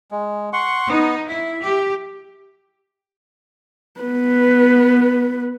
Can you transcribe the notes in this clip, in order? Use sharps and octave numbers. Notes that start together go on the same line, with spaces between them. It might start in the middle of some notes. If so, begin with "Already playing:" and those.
G#3
F#5 C6 C#6
B3 D#4
E4 E5
G4
B3 B4